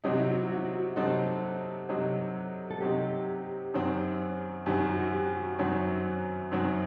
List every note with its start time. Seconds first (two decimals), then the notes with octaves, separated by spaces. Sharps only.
0.04 C3 F#3 C4 D#4 G4
0.12 F#4
0.19 E4
0.27 F#4
0.50 F#4
0.57 E4
0.64 F#4
0.96 C3 F#3 C4 D#4 A4
1.89 C3 F#3 C4 D#4
2.71 A4
2.81 C3 F#3 C4 D#4 G4
3.74 F#2 D#3 F#3 C4
4.66 F#2 D#3 F#3 C4 G4
4.90 F#4
5.00 F#4
5.13 G4
5.36 F#4
5.59 F#2 D#3 F#3 C4
6.51 F#2 D#3 F#3 C4